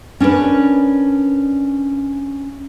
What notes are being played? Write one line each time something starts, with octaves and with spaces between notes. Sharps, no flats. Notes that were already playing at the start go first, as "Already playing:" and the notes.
C#4 D4 A#4 B4